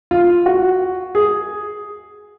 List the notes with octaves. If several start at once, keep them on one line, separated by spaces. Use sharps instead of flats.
F4
F#4
G#4